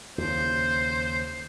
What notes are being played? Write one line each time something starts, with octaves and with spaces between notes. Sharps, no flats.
D#2 C#3 C5